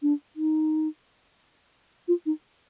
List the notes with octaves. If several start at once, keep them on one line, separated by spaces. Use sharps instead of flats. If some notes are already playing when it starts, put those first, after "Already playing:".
D4
D#4
F4
D#4